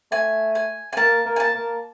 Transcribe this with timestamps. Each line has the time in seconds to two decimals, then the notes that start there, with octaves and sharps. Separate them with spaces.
0.12 A3 G#5
0.55 G#5
0.93 G#5
0.97 A#3 A5
1.26 A#3
1.36 G#5
1.40 A5
1.54 A#3